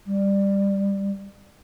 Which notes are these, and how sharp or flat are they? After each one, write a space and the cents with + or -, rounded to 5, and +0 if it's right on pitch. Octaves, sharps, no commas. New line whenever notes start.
G3 +15